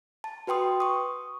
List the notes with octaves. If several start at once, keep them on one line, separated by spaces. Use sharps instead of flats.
A5
F#4 B4 G5 C6 D#6
C#6 D#6